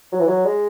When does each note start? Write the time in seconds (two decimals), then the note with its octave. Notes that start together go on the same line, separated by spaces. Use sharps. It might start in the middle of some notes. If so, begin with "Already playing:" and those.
0.12 F#3
0.20 E3
0.28 F#3
0.45 G#3